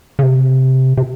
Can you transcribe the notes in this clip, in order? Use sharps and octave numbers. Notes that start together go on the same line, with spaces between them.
C#3
C3
C3